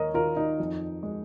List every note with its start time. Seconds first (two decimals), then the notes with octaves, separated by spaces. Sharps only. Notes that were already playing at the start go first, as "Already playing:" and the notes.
Already playing: D#2 G#3 A#4 C#5 D#5
0.14 D#3 F4 A#4
0.37 D#4
0.60 F2
1.03 G#3